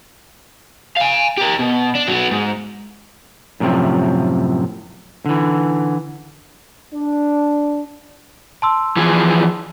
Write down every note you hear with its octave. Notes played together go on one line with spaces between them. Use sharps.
F5 G#5
G4 A#4
B2
D4
F#3 B3
G#2
F#2 A2 C3 E3 F3
D3 E3
D4
A5 C6 E6
E3 F3 G#4